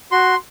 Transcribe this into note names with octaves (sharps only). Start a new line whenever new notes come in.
F#4 C6